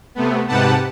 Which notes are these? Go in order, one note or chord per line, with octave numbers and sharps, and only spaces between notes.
C3 A3 B3
G#2 C3 G4 B4 F#5 A5